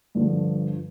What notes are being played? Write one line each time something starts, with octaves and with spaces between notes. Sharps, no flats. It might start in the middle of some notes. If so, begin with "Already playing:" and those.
G2 D3 F3